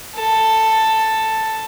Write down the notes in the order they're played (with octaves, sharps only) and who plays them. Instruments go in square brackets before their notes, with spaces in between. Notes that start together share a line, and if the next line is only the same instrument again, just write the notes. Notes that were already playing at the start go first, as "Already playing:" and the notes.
[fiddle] A4